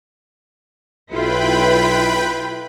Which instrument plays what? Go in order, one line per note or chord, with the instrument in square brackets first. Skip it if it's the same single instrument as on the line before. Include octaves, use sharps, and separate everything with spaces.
[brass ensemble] B1 [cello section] E4 F4 [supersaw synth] B4 G5 B5